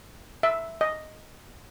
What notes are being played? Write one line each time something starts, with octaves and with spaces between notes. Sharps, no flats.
E5
D#5